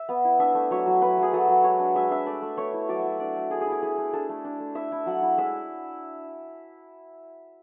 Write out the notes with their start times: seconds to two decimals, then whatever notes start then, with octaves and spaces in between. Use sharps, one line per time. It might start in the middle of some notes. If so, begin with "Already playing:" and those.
Already playing: E5
0.09 B3
0.25 E4
0.39 D4 E5
0.55 A3
0.71 F#3 C#5
0.86 F#3
1.01 F#3 B4
1.18 F#3 G#4
1.33 F#3 A4
1.48 F#3
1.64 G#3 C#5
1.79 D4
1.95 G#3 E5
2.11 D4 E5
2.26 A3 D5
2.42 A3
2.57 A3 C#5
2.74 E4
2.89 F#3 D5
2.99 E5
3.04 F#3
3.19 D4 D5
3.36 A3
3.51 A3 G#4
3.61 G#4
3.67 E4
3.72 G#4
3.82 E4 G#4
3.98 A3
4.13 D4 A4
4.29 A3
4.45 D4
4.60 A3
4.75 E4 E5
4.92 E4
5.06 F#3 F#5
5.23 E4
5.38 G#3 E5